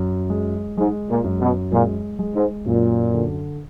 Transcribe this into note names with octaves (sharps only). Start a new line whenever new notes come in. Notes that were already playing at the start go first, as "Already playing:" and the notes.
Already playing: F#2
G#3
G#2 G#3
A#2
F#2
B2
A#2 G#3
G#3
G#2
F#2 A#2
D3